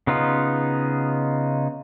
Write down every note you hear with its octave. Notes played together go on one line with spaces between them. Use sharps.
C#3 B3 D#4 F4